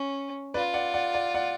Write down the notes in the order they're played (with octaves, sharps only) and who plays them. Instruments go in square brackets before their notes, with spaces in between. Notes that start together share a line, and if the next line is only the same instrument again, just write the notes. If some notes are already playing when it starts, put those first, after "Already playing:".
Already playing: [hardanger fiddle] C#4
[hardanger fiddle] F4 [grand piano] B4 D5
[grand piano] D5 F#5
D5 F#5
D5 F#5
D5 F#5